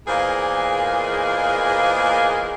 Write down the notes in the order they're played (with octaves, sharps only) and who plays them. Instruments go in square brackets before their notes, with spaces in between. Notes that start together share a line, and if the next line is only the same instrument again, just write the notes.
[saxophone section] E2 A#2 A#3 G#4 C5 D#5